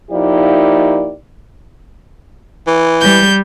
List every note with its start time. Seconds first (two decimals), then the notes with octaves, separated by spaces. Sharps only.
0.11 F3 A#3 D#4 E4 G4 D5
2.67 E3
3.01 G3 G6